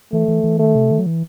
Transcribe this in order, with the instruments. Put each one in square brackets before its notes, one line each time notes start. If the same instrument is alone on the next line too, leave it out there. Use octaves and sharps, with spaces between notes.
[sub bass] E3 [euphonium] A3
[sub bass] E3
E3
[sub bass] D#3 [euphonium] A3
[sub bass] C3
D#3
F#3
E3